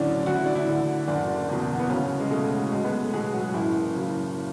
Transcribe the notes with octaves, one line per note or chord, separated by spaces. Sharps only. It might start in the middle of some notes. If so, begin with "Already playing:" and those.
Already playing: B1 A2 D3 E3 F#3 C#4 D4
D2 F#4
E4
D4
E3 E4
D3
F#1 D3 D4
E2 B2
B3
B1 C#3 C#4
G#3
B2 A3
B1 G#3
B3
A3
B2 G#3 G#4
F#3 F#4
F#1 E3 E4
F#2 C#3 E3